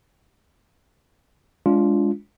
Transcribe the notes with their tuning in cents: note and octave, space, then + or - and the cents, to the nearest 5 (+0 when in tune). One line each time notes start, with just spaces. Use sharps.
G#3 +0 D4 -30 F4 +0